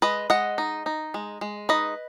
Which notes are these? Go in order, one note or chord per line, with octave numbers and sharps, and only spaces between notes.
G#3 B4 D#5
G#3 D#5 F#5
D#4
D#4
G#3
G#3
D#4 B4 D#5